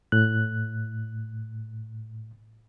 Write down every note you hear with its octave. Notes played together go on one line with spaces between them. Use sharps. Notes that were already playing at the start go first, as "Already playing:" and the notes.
A2 F#6